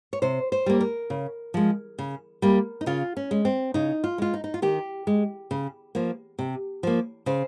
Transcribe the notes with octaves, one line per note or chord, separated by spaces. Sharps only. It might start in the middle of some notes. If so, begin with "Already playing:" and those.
C#5
C3 C5
C5
G3 A#3
A#4
C#3
F3 G#3
C#3
G3 A#3
D#4
C#3 F4
C#4
G#3
C4
C#3 D#4
F4
G#3 F4
D#4
D#4
F4
D#3 G4
G#3
C#3
F3 A#3
C3
F3 A#3
C#3 C5